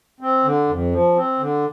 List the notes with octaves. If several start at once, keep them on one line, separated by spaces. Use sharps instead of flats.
C4
D3
F2
F3
C4
D3